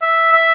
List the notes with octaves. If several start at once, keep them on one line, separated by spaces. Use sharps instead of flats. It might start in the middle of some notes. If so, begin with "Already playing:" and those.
E5
E5